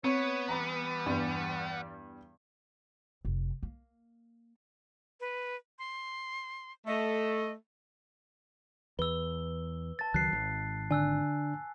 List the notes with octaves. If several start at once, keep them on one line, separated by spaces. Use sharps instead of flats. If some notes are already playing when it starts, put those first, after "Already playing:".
B3 C4 C#5
E3 G3 A#5 B5
E2 G2
F1
A#3
B4
C6
A3 D#5
E2 B4 E6 G7
A5 A6
C#2 D#3 F#3 F#6 C7
G#1
D3 D4 G#5 E6 F#6